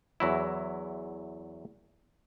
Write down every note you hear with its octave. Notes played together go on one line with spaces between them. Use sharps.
E2 F#3 E4